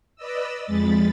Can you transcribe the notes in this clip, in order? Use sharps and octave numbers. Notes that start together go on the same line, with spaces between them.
B4 D5 D#5 E6
F2 G#3 B5 A6